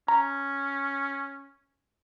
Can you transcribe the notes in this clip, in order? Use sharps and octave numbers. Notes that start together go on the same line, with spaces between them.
C#4 A#5